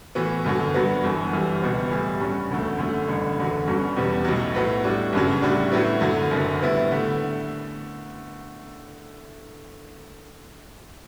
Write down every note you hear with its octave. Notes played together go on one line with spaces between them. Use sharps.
A2 E3 B3 F#4
G1 F#2 D3 F#3
G2 F#3 B3 F#4
G1 F#2 E3
G1 F#2 E3 G3
C#2 B2 G3 B3 F#4
A2 E3 G3
G2 F#3 C#4 F#4
E1 D2 D3 A3
F#2 D3 A3 C#4
A1 G2 D3
F#1 E2 D3 F#3
G1 G2 F#3 C#4
E2 B2 G3 B3
B1 A2 F#3
A2 F#3 B3
A2 G3 D4 F#4
G1 F#2 C#3 F#3
A2 G3 D4 F#4
A2 F#3 B3 E4
F#2 D3 F#3
F#1 F#2 D3
A2 G3 B3 E4
D3 A3